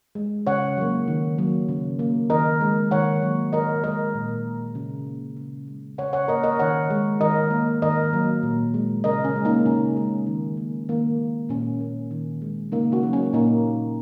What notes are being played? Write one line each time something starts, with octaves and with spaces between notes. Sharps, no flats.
G#3
C#3 C#5 F#5
F#3 A#3
D#3
F#3 A#3
C#3
A#3
D#3 A#4 D#5
G#3
D#3 C#5 F#5
F#3 A#3
D#3 A#4 D#5
G#3 A#4 D#5
A#2
A#3
C#3
A#3
C#3
G#3
C#3 C#5 F#5
C#5 F#5
A#3 A#4 D#5
A#4 D#5
D#3 C#5 F#5
G#3
D#3 A#4 D#5
A#3
D#3 A#4 D#5
F#3 A#3
A#2
G#3
C#3 A#4 D#5
C#4
G#3
A#3 D#4
C#3 C#4
G#3
D#3
A#3
D#3 A#3
G#3
A#2 C#4
A#3
D#3
G#3
C#3 A#3 D#4
C#4 F#4
F#3 A#3
C#4
A#2 A#3 D#4